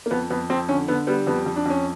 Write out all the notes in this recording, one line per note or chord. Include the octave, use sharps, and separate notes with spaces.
A#3
F2 B3
F2 B3
F2 C4
D3 C#4
D3 B3
G3 B3
F2 B3
F2
D4
F2 C#4